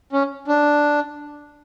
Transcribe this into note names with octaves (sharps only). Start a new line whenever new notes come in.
C#4
D4